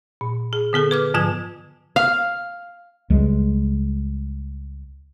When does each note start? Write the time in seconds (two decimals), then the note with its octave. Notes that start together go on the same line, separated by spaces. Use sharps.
0.21 A#2
0.53 G#4
0.73 D3 B3 G#4 A4
0.91 B4 D6 F6
1.14 G#2 D3 F3 F4 G#5 G#6
1.96 F5
3.10 C#2 G3 G#3